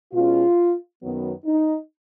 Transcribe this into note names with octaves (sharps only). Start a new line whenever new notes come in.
B2 G#3 C#4 F4
F#2 D#3 F#3 B3
D#4